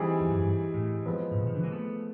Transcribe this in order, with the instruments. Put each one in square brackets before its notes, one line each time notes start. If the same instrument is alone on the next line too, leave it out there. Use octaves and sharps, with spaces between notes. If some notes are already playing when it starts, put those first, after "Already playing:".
Already playing: [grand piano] E3 G3 C4 D#4 G#4
[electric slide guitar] F2
F#2
G2
A2
[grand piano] F3 G#3 B3
[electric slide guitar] A2
A#2
D#3
D3 E3
G#3 A#3
A3 B3